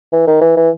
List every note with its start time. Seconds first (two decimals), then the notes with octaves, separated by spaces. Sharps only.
0.13 E3
0.27 D#3
0.41 E3
0.57 E3